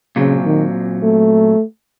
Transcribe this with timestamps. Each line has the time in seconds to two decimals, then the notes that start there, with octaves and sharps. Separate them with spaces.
0.16 A#2 C#3 F#3 C4
0.45 D#3
1.03 A3